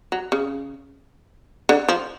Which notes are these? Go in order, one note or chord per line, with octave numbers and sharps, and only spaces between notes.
F#3
C#3
D3
F3